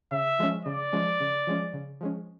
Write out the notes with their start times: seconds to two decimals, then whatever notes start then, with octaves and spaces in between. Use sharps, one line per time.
0.11 C#3 E5
0.39 F3 G#3 C#4
0.65 C#3 D5
0.93 F3 G#3 C#4
1.20 C#3
1.47 F3 G#3 C#4
1.73 C#3
2.01 F3 G#3 C#4